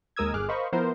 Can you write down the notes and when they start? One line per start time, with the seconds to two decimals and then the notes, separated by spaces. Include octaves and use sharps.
0.16 D#2 G#3 A#4 D#6 E6 G#6
0.34 G1 G#4 D6 F6 F#6
0.48 A#4 C5 D#5 F5 B5 C#6
0.73 F3 B3 E4 A#4 C5